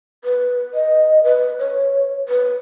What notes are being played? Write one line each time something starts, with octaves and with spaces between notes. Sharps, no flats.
B4
D#5
B4
C#5
B4